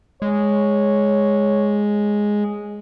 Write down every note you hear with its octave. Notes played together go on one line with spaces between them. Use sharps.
G#3 C#5